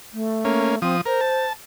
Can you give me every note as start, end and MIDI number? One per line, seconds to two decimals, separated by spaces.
0.13 0.81 57
0.45 0.76 58
0.45 0.76 61
0.82 1.01 53
0.82 0.96 60
0.82 1.01 87
1.06 1.21 70
1.06 1.45 72
1.21 1.53 81